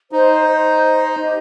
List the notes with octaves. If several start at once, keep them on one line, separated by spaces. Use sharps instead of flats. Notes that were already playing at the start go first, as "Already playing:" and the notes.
D#4 C5
C5
D#5
G4